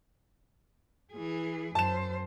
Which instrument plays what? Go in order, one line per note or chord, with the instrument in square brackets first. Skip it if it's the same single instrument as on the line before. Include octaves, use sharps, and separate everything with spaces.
[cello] E3 G#4
[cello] F#2 C5 [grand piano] A5 E7